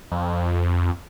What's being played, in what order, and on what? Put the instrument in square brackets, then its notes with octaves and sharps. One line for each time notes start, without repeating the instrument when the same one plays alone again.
[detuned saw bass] F2